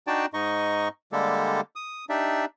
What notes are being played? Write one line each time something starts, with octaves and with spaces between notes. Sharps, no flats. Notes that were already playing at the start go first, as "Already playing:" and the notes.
D4 D#4 F#4 D5 G5 A5
G#2 D#4 D#5 C#6
D3 G3 G#3 A#3 G4 A4
D#6
D4 D#4 G4 D5 E5